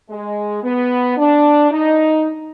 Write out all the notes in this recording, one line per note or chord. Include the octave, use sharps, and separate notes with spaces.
G#3
B3
D4
D#4